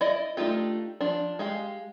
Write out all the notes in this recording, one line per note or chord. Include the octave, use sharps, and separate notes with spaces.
E4 D5 D#5
A3 D4 D#4 F4 G4
F3 D4
G#3 G4 F5